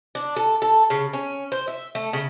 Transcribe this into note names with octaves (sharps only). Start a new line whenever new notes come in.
D4
A4
A4
C#3
C#4
C5
E5
A3
C#3